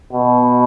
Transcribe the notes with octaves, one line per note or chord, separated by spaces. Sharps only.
B2